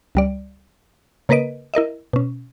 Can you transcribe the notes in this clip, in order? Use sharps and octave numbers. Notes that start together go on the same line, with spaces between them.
C#2 G3 D5
C#3 A#3 A#4 B4 D#5 D7
E4 A#4 D#5 E5
B2 C#4